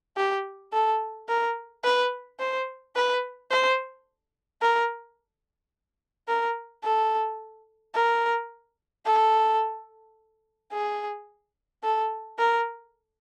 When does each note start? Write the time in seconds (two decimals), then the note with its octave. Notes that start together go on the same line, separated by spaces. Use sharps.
0.17 G4
0.73 A4
1.28 A#4
1.84 B4
2.39 C5
2.95 B4
3.50 C5
4.62 A#4
6.28 A#4
6.84 A4
7.95 A#4
9.06 A4
10.72 G#4
11.83 A4
12.39 A#4